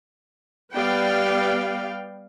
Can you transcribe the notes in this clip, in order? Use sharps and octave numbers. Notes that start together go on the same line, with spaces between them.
G3 B3 B4 D5 F5 G5